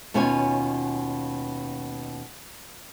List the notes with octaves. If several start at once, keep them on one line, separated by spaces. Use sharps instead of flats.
D#2 B2 C#4 F4 C#5 G#5